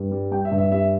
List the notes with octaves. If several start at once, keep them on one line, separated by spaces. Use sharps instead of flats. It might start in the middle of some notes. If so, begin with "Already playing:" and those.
Already playing: G2
G3
G3 G5
E5
G2
E5
G3 E5